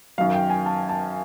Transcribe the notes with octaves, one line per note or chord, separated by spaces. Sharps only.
F#2 D#3 F#3 F5
G5
G#5
A5
A5